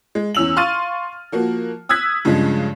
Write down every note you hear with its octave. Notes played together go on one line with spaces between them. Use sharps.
G#3
E2 C#4 E6 F7 F#7
F5 C6 C#6 F6 A6 D#7
F3 A#3 F#4
D#6 E6 F#6 G#6 B6
G2 C#3 F3 G#3